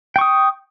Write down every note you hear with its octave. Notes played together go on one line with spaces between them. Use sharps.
G5 C#6 D#6